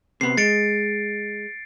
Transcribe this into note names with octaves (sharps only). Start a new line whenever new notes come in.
C3 B3 C7
G#3 A6 C#7 D7